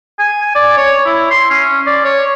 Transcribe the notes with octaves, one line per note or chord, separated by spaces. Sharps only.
G#5
D5
C#5
E4
C6
C#4
D5
C#5